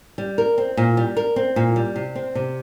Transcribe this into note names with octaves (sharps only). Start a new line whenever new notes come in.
G3
A#4
C4
A#2
G3
A#4
C4
A#2
G3
C3
C4
C3